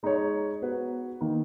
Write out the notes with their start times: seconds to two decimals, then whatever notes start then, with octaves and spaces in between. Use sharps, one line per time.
0.03 G#3 D#4 G#4 C#5
0.61 B3 F#4 B4
1.21 D#3 A#3 D#4